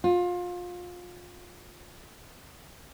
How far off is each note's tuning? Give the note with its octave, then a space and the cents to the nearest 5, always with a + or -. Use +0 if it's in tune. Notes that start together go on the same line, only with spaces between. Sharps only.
F4 +25